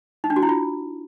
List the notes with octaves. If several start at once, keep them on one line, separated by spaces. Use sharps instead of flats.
D#4
D4
F#4
E4
F4